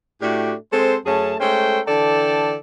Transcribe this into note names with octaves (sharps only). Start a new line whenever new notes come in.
A2 A3 D4 F#4 G4
G#3 C4 A4 C5
F#2 A3 C#4 G#4 A5
G#3 A3 C#4 A4 C5 G5
D3 E3 A4 D5 G5 A5